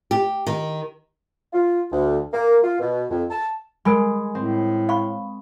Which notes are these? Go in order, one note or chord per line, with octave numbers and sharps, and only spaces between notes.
G4
D#3
F4
D2
A#3
F4
B2
F2
A5
G#3 A#4 G#5 B5
A2 C4
F5 B5 C#6